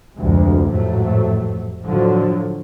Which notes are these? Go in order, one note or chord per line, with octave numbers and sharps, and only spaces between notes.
F1 D2 G#3
A1 F2 G#2 F#3 A3
A2 D3 F3 F#3